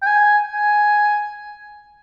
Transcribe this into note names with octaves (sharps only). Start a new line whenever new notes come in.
G5
G#5
G#5